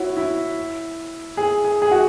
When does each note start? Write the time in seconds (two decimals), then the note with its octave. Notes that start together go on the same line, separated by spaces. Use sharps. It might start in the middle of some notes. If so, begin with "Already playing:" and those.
Already playing: E4 F#4 C#5
0.17 E4
1.37 G#4
1.65 G#4
1.82 G#4
1.91 F#4